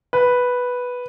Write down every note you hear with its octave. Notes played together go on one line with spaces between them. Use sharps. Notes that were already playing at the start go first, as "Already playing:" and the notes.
B4